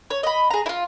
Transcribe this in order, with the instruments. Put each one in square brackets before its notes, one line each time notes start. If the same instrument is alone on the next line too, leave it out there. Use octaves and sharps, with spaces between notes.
[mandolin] C#5
D#5 B5
G#4 A#5
E4 F4